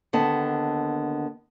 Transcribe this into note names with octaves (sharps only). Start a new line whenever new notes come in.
D#2 D3 B3 D#5 A5